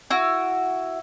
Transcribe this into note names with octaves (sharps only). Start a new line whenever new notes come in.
E4 F#4